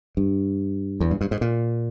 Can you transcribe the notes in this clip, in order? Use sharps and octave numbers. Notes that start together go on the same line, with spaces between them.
G2
E2
G2
G2
G#2
A#2